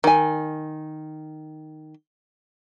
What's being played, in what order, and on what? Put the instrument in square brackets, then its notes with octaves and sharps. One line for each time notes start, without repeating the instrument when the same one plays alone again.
[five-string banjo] D#3 G#5